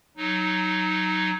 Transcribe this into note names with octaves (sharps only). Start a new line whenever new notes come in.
F#3 D#4